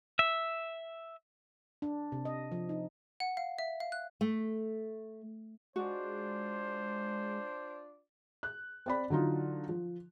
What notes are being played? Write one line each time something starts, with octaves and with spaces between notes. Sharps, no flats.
E5
D4
C3
D#5
F3
D#4
F#5
F5
E5
F5
F#6
A3
G#3 D4 F4 F#4 C5 D5
F#6
C4 D5 B5
D3 F#3 D#4 F4
F3